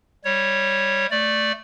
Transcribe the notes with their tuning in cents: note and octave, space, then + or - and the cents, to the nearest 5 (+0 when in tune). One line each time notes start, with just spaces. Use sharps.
G3 +0 C#5 -10
A3 +0 D5 +0